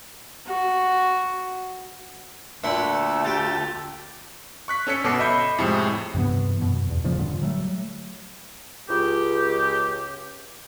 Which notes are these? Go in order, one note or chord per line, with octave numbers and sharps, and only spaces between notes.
F#4
D2 A#2 E5 F#5 C6
F4 G4 A4
C#6 F#6 B6
C#4 A4 C#5 B6 C#7
G1 B2 A4 D6 C7
D#5 E5 B5 G6 C#7
F2 A2 C3 G#3 C#7
G2 C3 E3 B3
F#2 B2
E2
A#2 C#3 F3 A#3
D2 G2 A#2 D3
F#3 G3 A3
C#2 G4